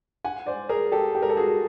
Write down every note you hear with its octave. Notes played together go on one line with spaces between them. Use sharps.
F#5 G#5
C5 D5
G#4 A#4
G4 A4
G4
A#4
A4
F#4 G#4